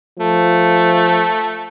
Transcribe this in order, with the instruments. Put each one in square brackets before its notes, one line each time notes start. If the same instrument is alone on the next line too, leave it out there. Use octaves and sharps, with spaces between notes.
[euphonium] F3 [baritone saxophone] A3